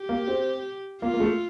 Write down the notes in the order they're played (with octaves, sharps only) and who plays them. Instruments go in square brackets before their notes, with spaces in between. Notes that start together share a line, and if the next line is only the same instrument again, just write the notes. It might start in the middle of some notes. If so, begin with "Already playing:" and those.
Already playing: [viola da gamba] G4
[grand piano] A#3
C4
[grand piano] A#3 [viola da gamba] F4
[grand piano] A#3
A3